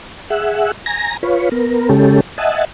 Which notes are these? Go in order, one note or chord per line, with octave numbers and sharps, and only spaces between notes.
G#4 E5 F#5
G#5 A#5 A#6
F4 B4 C#5
B3 A#4
C#3 G#3 C#4 G4 A4
D#5 E5 F#5 G#5 A5